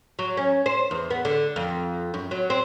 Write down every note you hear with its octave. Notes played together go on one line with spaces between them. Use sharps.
F#3
C#4
C5
E2
B3
D3
F2
F#2
F#3
C4